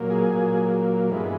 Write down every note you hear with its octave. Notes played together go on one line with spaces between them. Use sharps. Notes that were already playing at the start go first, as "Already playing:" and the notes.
Already playing: A#2 F#3 A#3
G#4
A#2 F#3 A#3
G2 E3 G#3 B3